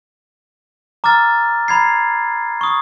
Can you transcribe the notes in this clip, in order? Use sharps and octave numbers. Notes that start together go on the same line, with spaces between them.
A#5 D6 E6 F6 A6
A#5 B5 G#6 C7
C#6 D#6